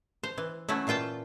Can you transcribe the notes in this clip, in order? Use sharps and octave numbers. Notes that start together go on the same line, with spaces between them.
C5
E3
F#3 A3 C#4 E4
A#2 E3 F4 G5 A5